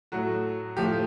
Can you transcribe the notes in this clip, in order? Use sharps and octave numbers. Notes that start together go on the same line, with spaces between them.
A2 F#3 A3 F#4
A2 F3 A3 G4